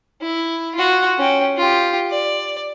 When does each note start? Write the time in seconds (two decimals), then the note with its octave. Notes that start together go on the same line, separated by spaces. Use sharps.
0.22 E4
0.75 F4 F#4
1.18 C#4 G5
1.57 F4 G4
2.10 D5